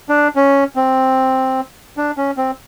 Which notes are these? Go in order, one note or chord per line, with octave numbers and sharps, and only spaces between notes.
D4
C#4
C4
D4
C#4
C4